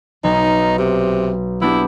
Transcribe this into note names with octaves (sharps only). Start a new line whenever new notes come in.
B1 D#4
C3
B3 D4 E4 G4